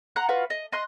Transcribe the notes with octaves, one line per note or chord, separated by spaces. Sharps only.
F#5 A#5 C6 F#6
F4 F#4 B4
D#5
D#5 C6 F#6